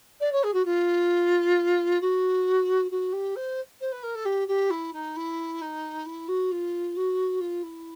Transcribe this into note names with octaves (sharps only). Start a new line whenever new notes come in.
D5
C#5
G#4
F#4
F4
F#4
F#4
G4
C5
C5
B4
A#4
A4
G4
G4
E4
D#4
E4
D#4
E4
F#4
F4
F#4
F4
E4